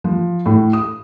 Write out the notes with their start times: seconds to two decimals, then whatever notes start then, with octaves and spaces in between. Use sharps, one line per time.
0.04 F3
0.46 A2
0.73 D#6